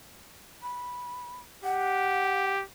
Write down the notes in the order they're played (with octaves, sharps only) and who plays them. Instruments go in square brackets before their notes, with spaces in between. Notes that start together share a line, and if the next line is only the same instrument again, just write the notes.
[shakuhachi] B5
[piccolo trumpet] G4 [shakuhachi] F#5